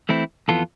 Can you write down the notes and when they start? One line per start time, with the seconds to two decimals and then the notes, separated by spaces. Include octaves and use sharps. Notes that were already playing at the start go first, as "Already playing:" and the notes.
0.09 E3 A3 C4 E4
0.48 F2 E3 B3 F4 A4